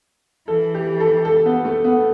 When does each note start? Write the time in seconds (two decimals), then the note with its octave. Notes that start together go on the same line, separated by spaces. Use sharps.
0.48 E3 A4
0.75 G4
1.00 A4
1.25 A4
1.46 B3
1.65 A3
1.84 B3